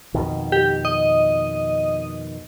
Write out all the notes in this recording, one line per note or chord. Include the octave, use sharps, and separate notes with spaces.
F2 B2 D#3
G4
D#5